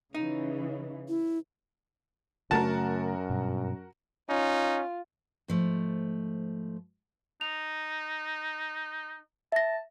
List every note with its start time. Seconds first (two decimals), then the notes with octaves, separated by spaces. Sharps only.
0.15 C#3 E3 D#4
1.09 E4
2.51 F#2 C#3 A3 F#4 A#4 A5
3.30 G2 B2
4.30 C#4 D#4 F4
5.48 G#2 F3 A3
7.41 D#4 F7
9.52 E5 A5 A#6